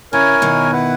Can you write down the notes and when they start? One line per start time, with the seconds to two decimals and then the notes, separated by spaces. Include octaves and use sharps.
0.12 C#3 E4 A#4 C#5 G#5
0.42 B2 D#3
0.72 E4 B4 F#5